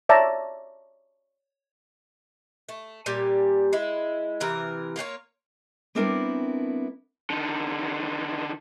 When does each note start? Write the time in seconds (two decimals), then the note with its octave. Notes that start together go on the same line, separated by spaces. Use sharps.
0.09 C#5 D5 E5 A5 A#5
2.69 A3
3.06 A#2 G3 G4 G#5
3.73 G#3 E4
4.40 C3 E3 A#4
4.96 A#3 F4 F#4 C#5
5.95 G3 B3 C4 D4 E4 A#4
7.30 D3 D#3